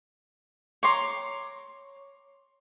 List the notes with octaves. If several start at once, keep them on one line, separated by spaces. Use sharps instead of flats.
C#5 A#5 C6 D6